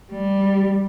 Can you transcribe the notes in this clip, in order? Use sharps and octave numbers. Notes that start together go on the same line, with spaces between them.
G3